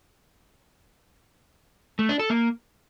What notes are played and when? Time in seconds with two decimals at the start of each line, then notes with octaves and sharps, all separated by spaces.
1.99 A3
2.09 D4
2.19 A4
2.30 A#3